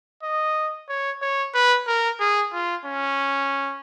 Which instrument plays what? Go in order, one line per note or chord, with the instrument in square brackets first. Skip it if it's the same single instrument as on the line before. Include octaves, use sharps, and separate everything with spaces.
[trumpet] D#5
C#5
C#5
B4
A#4
G#4
F4
C#4